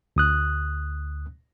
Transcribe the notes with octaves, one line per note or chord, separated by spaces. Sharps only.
D2 D#6 F#6